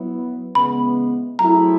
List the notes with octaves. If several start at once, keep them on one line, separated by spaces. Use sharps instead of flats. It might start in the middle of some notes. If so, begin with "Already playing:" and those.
Already playing: F#3 B3 E4
C#3 E3 G#3 B3 B5
F#3 A3 C4 E4 G#4 A#5